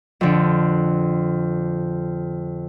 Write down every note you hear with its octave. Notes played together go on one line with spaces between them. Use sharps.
F2 D3